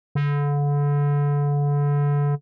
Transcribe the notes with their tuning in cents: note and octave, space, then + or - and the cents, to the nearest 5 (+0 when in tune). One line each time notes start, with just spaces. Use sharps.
D3 -30